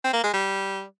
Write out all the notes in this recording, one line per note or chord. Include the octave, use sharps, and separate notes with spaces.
C4
A#3
G#3
G3